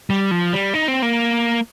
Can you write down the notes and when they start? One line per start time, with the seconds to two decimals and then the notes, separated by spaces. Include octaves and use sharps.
0.10 G3
0.31 F3
0.53 G3
0.74 D#4
0.88 C4
1.02 A#3